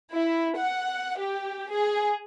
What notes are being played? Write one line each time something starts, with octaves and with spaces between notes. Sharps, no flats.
E4
F#5
G4
G#4